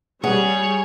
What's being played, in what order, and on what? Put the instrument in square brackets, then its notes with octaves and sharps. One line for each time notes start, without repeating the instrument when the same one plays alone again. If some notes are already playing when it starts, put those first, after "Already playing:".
[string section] G3 [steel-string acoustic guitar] G#4 [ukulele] B4 F#5 [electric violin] C#5